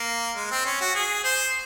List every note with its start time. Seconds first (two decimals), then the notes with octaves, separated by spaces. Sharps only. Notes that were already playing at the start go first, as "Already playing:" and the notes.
Already playing: A#3
0.36 G#3
0.51 C4
0.66 C#4
0.81 F#4
0.95 G#4
1.24 C5